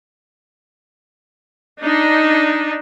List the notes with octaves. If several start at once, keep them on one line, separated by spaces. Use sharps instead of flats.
D4 D#4